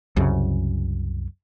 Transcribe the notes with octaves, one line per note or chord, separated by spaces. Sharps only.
C2 F#2 C#3